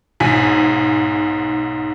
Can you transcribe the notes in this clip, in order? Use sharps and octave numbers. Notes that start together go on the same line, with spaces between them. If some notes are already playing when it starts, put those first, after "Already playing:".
B1 G#2 G#5 B6